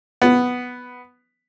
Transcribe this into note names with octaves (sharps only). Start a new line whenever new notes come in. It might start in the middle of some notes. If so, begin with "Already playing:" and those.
B3